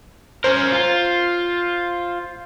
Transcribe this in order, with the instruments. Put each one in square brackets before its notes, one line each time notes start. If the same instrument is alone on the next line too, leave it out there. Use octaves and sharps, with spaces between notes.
[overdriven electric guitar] C#4 A#4 [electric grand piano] C5
[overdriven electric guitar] F4